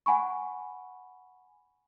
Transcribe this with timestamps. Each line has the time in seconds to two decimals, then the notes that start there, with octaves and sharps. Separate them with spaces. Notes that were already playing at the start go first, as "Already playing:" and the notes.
0.06 F#5 G#5 B5 C#6